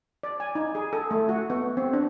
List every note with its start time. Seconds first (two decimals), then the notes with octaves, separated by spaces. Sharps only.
0.23 D5
0.40 G#5
0.55 D#4
0.75 G#4
0.93 A4
1.11 A3
1.29 F#4
1.50 B3
1.77 C4
1.93 D4